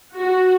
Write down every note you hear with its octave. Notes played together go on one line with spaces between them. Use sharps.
F#4